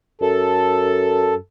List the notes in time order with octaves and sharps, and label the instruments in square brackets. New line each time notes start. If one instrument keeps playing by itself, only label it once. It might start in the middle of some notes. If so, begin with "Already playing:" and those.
[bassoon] F#2 [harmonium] A4